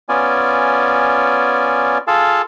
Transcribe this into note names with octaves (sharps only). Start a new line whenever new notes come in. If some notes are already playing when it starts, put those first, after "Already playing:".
B3 C#4 F4 D5 G#5
F4 G#4 A4 F5 A5